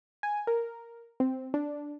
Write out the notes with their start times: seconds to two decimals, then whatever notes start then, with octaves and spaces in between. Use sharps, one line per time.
0.23 G#5
0.47 A#4
1.20 C4
1.54 D4